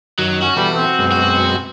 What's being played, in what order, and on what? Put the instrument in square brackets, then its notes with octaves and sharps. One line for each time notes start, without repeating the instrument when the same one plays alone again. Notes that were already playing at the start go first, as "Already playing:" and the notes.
[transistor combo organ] F#2 D#3 [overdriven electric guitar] F#3
[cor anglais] C#4 [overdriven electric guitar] F#4
[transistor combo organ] B2 E3 A4 [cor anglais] G3
[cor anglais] C4
[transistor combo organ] F#2 B2 G#3
[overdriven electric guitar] F#4